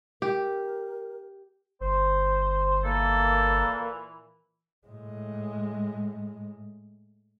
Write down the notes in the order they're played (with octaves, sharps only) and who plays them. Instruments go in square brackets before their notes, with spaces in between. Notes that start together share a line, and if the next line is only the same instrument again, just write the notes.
[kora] G4 [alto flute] A#4
[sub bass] G1 [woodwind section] C5
[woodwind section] A#2 E3 [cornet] A#3 [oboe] A4
[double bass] A2 G#3